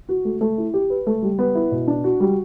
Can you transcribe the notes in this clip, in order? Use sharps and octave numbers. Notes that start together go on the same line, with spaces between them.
F#4
A3
A3
E4
G4
B4
A3
G3
B3
E4
B2
D4
F#4
G3